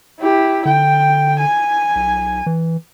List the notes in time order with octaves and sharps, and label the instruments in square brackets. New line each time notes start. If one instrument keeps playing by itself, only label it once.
[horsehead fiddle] E4 G4
[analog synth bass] D3 [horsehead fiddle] G5
[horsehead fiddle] G#5
[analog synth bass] B1
E3